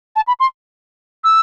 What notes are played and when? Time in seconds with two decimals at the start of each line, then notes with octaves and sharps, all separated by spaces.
0.16 A5
0.27 B5
0.40 C6
1.24 E6